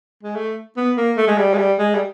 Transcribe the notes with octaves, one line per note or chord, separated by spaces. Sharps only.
G#3
A3
B3
A#3
A3
G#3
G3
G#3
G3
G#3
G3